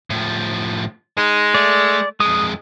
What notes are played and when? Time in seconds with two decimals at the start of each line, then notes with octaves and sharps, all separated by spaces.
0.10 A2 F3
1.18 G#3 D#4
1.55 A3 D5
2.20 F2 G#3 D#6